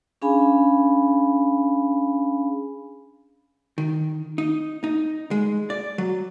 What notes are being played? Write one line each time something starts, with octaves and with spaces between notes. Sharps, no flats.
C#4 D4 G#4 F5 G#5 B5
D#3
D#4
D#4
G#3
D5
F#3